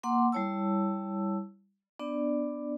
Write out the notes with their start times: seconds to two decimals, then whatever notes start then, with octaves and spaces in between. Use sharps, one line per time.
0.03 A#3 F#5 C6 D6
0.32 G3 E4 C#5 A5 E6
2.00 B3 D4 D5